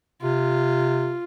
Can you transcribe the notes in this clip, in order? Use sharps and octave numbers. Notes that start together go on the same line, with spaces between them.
C3 F4